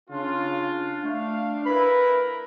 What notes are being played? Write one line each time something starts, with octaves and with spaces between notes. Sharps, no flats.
C#3 D4 F4
A3 D4 F5
E4 A#4 B4 B5